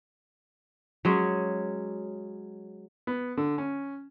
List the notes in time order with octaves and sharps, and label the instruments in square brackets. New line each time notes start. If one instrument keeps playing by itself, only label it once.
[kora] F#3 G#3 C#4
[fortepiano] B3
D3
C#4